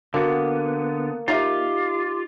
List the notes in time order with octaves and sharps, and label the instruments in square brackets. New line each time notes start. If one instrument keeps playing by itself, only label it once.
[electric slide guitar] D3 B3 [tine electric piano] A#3 [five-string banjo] F#4
[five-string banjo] D#4 E5 [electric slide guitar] F4 [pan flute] G4